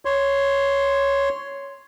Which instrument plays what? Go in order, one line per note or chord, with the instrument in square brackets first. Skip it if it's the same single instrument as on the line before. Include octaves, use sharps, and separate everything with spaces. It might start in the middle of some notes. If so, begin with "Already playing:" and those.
[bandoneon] C#5 C6